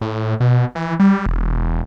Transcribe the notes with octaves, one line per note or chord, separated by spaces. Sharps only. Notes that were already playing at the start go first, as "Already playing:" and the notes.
A2
B2
E3
G3
E1